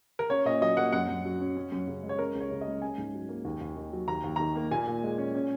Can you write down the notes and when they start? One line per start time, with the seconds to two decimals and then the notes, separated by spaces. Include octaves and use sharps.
0.19 A#4
0.30 C#4 C#5
0.45 A#2 D#5
0.61 F#3 D#5
0.77 A#3 F#5
0.92 F#2 F#5
1.08 F#2
1.25 F#3
1.41 C#4
1.57 C#4
1.72 F#2
1.87 C#3
2.03 G#3
2.09 C#5
2.19 C#4 A#4
2.35 C#2
2.40 C#5
2.51 C#3
2.61 D#5
2.67 G#3
2.82 C#4 G#5
2.98 G#2
3.14 F#3
3.29 A#3
3.45 D#2
3.61 D#2
3.77 D#3
3.93 F#3
4.08 D#2 A#5
4.24 D#2
4.36 D#3 A#5
4.56 A#3
4.71 A#2 G#5
4.87 A#2
5.03 G#3
5.18 C#4
5.35 C#4